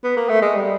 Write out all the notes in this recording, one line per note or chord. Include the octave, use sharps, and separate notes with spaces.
B3
A#3
A3
G#3
G3